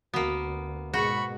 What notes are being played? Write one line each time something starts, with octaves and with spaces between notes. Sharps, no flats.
D2 A#3 B3 F#4
G#2 B2 F#4 G#4 B5 C#6